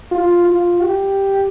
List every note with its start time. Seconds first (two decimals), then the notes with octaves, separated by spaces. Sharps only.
0.11 F4
0.46 F4
0.81 G4